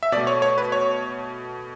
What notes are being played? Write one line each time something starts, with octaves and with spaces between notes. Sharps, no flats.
E5
B2 A3 D5
C#5
C#5
B4
C#5